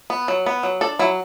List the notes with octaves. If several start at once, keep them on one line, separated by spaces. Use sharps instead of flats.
B3
F#3
B3
F#3
D4 A4
F#3 E4